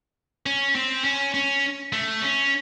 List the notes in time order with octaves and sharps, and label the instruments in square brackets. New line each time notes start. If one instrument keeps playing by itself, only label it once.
[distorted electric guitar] C#4
C4
C#4
C#4
A3
C#4